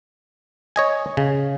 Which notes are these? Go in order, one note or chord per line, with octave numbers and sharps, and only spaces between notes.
C#5 D#5 G#5
C#3